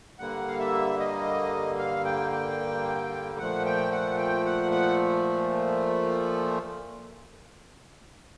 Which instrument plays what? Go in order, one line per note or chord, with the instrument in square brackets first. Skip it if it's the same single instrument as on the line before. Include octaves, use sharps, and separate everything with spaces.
[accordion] G2 D3 G3 A#3 F#5
F5
E5
D#5
F5
G5
G5
A#2 F3 A3 F#5
G5
F#5
G5
F#5
F#5